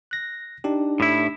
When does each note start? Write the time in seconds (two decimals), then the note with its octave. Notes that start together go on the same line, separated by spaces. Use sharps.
0.11 F#6 A#6
0.64 D4 D#4 G4
1.00 A2 E4